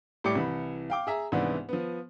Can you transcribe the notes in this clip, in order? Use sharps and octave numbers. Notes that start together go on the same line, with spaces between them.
A2 G3 G4 D6 C#7
C2 E3 B5
F5 G5 D6
G#4 E5 A#5
C2 G#2 E3 B3 D4 E4
F3 B3